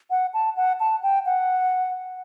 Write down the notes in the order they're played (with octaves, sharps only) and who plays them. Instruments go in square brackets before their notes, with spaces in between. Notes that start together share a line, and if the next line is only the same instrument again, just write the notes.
[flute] F#5
A5
F#5
A5
G5
F#5